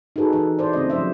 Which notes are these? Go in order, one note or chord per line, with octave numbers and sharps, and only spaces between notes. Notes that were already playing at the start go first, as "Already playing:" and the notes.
D#4 F#4 G#4 A4 B4
E3 D#4 A4 B4
E4 C5 D5
C#3 A3 C4 D#5
F3 F#3 C5 E5